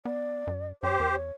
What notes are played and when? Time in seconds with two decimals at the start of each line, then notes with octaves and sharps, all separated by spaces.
0.05 B3 D5
0.47 F#2
0.83 F#2 G4 C5 C#5
1.00 E2 A#4
1.14 C#5